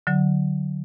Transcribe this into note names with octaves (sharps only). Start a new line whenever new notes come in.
D3 F#3